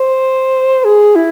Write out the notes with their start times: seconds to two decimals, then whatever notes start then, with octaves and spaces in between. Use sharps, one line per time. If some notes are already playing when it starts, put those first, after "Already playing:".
Already playing: C5
0.84 G#4
1.15 E4